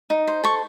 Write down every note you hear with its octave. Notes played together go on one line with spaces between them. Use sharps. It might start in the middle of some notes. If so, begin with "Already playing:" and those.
D#4
C5
A4 C#6